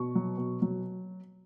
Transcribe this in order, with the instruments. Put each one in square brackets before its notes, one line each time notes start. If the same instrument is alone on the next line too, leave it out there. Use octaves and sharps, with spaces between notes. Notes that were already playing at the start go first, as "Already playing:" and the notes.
Already playing: [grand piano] B2 C#6
F#3
B2
F#3